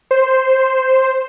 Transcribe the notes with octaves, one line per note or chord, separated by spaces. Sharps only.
C5